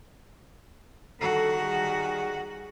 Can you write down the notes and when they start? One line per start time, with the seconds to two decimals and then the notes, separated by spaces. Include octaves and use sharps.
1.20 D3 D#3 G3 F#4 A4
1.60 G3 G#4